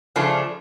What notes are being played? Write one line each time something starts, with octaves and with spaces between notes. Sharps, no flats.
C#3 F3 A3 D4